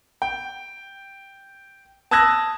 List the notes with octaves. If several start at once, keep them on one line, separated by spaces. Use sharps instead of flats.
G5
A5 D#6 E6 F#6 G#6 A#6